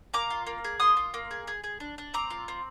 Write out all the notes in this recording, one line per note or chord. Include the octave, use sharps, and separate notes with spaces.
A#3 A#5 D6
F4
A#3
G#4
A#3 C6 D#6
F4
A#3
G#4
G#4
G#4
D4
D4
C4 A#5 D6
F4
C4